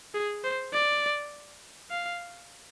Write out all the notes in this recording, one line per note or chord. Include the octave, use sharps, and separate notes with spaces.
G#4
C5
D5
F5